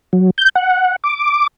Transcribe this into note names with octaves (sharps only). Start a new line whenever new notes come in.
F#3
G6
F#5
D6